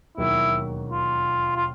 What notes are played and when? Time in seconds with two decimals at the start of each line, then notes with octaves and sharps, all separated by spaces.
0.17 E1 D#2 D#3 F#3 E4
0.91 F4
1.56 F4